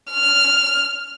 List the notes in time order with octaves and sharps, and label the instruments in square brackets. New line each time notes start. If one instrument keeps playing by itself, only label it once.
[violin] F6